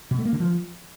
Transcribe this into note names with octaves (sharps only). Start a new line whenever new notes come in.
B2
A3
A#3
D3
F3